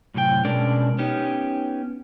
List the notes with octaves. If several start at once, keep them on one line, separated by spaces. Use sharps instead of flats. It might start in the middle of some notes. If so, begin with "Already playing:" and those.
F#2 A2 C3 F#4 G5
B2 G#3 C#4 D4 A#4 D5
B3 C#4 D#4 G4